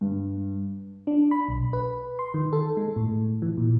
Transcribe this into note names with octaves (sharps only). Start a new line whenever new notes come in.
G2
D4
B5
B1
B4
C6
D#3
A4
G#3
A2
E3
A#2